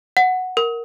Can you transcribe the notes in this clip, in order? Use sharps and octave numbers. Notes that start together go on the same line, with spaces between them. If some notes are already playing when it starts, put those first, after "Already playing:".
F#5
A#4